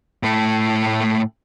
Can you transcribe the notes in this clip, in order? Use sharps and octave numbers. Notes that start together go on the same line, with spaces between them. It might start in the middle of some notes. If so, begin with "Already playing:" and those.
A2 A3